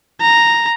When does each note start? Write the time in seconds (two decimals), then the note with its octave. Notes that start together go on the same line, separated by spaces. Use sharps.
0.21 A#5